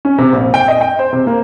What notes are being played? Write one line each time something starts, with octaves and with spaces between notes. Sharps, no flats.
C#4
C3
A#1
G5
D#5
G5
C5
C3
A#3